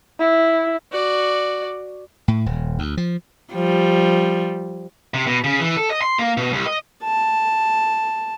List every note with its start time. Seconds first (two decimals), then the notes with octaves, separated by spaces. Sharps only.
0.19 E4
0.92 F#4 D5
2.28 A2
2.46 D#1
2.79 D2
2.97 F3
3.52 F3 G3
5.14 C3
5.27 B2
5.44 C#3
5.60 E3
5.77 A4
5.90 D#5
6.02 C6
6.19 A#3
6.37 B2
6.53 C2
6.66 D#5
7.04 A5